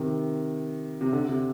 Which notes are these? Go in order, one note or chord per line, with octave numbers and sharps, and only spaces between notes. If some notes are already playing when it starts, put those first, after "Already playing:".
Already playing: C3 D#3
C3
D3
C3